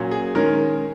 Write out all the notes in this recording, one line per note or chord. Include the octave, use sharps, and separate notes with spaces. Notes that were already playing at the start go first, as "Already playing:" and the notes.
Already playing: A#2 F#3 C#4
G#4
D#3 G#3 C#4 A#4